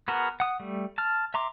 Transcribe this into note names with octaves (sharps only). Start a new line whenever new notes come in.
B3 F#4 G#4 A#4
F#5 D#6
G3 A3
A5 F6
E5 A#5 C6 D6